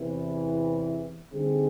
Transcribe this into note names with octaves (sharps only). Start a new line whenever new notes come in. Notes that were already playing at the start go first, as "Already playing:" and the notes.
Already playing: E2 C3 E3
D3 G3 C4 D#4 G#4